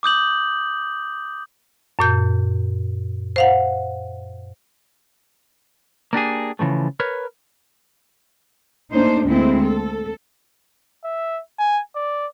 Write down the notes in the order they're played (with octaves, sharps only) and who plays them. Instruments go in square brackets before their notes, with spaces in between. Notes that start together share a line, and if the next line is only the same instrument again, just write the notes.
[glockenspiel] D6 D#6 G6 F#7
[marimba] F#2 A#2 G6
C5 F5 F#5
[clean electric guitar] A#3 D4 G4 G#4
C#3 E3 F3 A3
A#4 B4 C#5
[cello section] A3 A#3 D4 D#4 C5
D2 G#3 A#3 C4 E4
A4
[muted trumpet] E5
G#5
D5